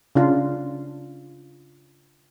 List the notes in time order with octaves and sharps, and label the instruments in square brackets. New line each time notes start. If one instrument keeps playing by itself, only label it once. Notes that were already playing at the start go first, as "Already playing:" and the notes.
[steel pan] C#3 D4 F4